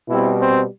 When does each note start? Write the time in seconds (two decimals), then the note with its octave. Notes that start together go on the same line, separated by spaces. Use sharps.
0.09 B2 G3 C4 E4
0.39 C4